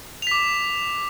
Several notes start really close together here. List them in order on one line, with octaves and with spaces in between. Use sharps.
F7 B6 D6